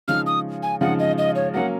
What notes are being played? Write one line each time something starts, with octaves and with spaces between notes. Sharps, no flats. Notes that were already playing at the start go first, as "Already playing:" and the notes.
C#3 F3 G#3 D#4 F6
D#6
G#5
C#3 F3 G#3 D#4 F#5
D#5
D#5
C#5
F#3 A#3 C#4 F#5